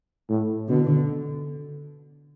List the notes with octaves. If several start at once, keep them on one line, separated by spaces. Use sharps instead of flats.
A2
B2 D3